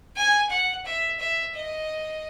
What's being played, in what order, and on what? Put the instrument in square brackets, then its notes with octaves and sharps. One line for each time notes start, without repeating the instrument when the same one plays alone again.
[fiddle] G#5
F#5
E5
E5
D#5